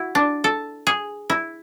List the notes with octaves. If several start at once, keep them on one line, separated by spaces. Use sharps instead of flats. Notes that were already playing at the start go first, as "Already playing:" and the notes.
Already playing: E4 F#4
D4
A4
G#4
E4